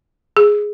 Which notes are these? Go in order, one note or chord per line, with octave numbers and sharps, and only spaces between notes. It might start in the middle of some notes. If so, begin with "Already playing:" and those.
G#4